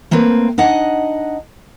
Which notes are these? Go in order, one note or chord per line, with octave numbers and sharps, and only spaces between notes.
A3 A#3 C4 B4
D4 D#4 D#5 F#5